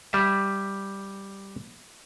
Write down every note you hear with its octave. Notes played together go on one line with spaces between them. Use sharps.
G3 E5